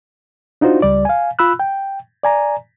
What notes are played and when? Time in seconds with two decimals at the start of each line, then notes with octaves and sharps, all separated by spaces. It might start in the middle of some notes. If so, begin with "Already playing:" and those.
0.61 D4 D#4 F4 F#4 C5
0.82 C#2 G3 D5
1.05 F5 G#5
1.39 F4 B5 E6 F#6
1.60 G5
2.23 D5 G#5 A#5